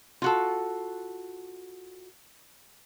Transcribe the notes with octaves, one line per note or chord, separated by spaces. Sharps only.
F4 F#4 A4